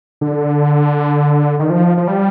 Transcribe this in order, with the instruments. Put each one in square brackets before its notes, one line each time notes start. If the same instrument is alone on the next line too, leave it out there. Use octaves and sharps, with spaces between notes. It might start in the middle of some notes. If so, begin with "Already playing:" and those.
[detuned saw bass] D3
D#3
F3
F3
G3